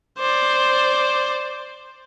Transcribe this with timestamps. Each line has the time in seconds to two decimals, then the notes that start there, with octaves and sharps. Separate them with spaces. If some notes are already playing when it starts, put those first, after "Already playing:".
0.19 C5 D5